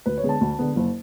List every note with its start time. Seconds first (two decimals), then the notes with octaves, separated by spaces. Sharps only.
0.06 D2 B4
0.18 C#5
0.23 D3 G#3 B3
0.29 A5
0.41 D2
0.59 D3 G#3 B3
0.76 F#1